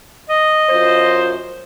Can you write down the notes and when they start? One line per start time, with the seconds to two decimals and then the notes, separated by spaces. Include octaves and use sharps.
0.30 D#5
0.70 F#2 F4 C5